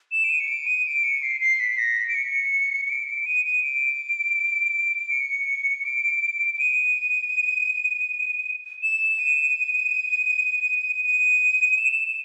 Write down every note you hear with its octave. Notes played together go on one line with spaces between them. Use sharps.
E7
D7
D#7
C#7
D7
D#7
D7
C#7
C7
C7
B6
A#6
B6
D7
C#7
C#7
D7
D7
D#7
D#7
D7
C#7
D7
D7
D#7
E7
D#7
D#7
E7